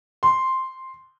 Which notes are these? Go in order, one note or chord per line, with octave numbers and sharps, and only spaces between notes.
C6